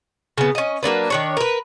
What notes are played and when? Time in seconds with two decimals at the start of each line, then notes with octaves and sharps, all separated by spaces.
0.38 C#3 B3
0.55 C#4 D#5
0.83 F#3 A#3 D4 B4
1.10 D#3 D4 C#5
1.37 A#4 B4